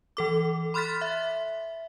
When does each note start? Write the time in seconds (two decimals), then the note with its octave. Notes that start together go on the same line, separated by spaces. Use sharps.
0.17 E3 A4 D6
0.74 B5 C6 F6 F#6 A6 B6
1.01 E5